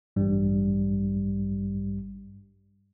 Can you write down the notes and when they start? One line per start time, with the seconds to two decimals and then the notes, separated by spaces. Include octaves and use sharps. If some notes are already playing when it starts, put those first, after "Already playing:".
0.16 A1 G2 G3